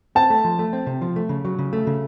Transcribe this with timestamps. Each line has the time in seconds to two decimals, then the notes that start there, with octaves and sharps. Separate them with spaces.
0.15 C4 A5
0.30 A3
0.44 F3
0.59 A3
0.73 C4
0.86 C3
1.01 F3
1.16 A3
1.29 C#3
1.45 F#3
1.59 C#3
1.73 A3
1.87 C#3